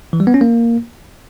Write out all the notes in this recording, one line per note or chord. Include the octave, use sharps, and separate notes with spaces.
E3
G3
B3
C#4
A#3